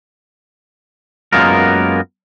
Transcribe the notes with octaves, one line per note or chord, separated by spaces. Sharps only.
F#2 G#3 A#3 B3 F4 A#4